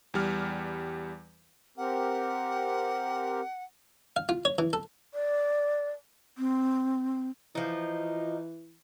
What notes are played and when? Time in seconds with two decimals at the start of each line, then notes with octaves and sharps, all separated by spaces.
0.14 E2 G3 F6
1.77 C4 G4 A#4 F#5
4.16 F5
4.29 F4
4.45 C#5
4.58 E3
4.73 A4
5.14 D5
6.38 C4
7.55 E3 F3 D#4